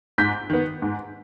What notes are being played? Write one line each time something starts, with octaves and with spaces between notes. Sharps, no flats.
G#2 G6 B6
D#3 B3
G#2